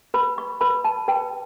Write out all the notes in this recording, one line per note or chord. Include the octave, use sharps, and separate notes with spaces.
B4 B5
C#6
B4 B5
A5
B4 G5